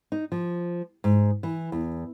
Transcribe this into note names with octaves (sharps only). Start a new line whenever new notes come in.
D#4
F3
G#2
E3
E2